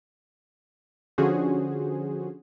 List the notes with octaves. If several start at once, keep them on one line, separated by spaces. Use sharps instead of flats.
D3 F3 C#4 F#4 G#4 C5